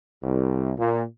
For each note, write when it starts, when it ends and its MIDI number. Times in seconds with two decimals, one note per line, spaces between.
0.23 0.73 36
0.78 1.03 46